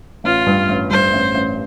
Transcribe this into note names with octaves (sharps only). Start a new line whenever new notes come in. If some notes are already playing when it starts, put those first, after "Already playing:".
A1 F4
G2
A1
G2 C5
A1
A1